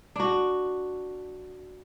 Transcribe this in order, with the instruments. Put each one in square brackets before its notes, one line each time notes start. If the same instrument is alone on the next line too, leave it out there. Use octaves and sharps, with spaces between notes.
[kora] D4 F#4